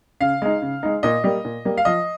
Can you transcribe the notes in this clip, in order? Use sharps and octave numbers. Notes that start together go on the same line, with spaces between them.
C#3 F5
G#3 D#4
C#3
G#3 D#4
A#2 D#5
G3 A#3
A#2
G3 A#3
F5
F3 D#5